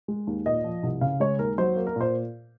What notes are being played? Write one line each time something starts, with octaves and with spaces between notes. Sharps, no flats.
G#3
D#2
A#2 D#5
F3
C2
C#3 F5
G#3 C#5
D#2 A#4
F#3 C5
A#3
A#4
A#2 C5